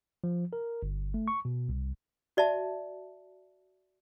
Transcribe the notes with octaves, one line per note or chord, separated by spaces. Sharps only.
F3
A#4
G1
A3
C#6
B2
C2
F#4 D5 E5 A5